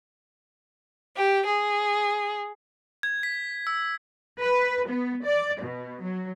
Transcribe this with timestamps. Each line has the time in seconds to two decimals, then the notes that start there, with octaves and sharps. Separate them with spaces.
1.17 G4
1.46 G#4
3.03 G#6
3.23 B6
3.67 E6
4.41 B4
4.88 B3
5.25 D5
5.62 B2
6.02 F#3